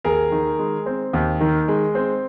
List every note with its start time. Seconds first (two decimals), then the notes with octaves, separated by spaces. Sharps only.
0.04 D#2 G#4 A#4
0.32 D#3
0.59 G#3
0.86 C4
1.13 D#2
1.41 D#3
1.68 G#3
1.95 C4